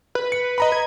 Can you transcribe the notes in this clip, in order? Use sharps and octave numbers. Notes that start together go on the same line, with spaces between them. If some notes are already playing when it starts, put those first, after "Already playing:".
B4
C#7
D#5 A#5 B5
G#6